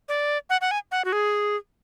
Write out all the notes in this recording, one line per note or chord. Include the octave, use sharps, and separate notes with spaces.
D5
F#5
F#5
G#5
F#5
F#4
G#4